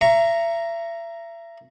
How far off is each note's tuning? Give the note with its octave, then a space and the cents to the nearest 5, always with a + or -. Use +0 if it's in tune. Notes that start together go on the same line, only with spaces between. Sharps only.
E5 +35 A#5 +0 C#6 +5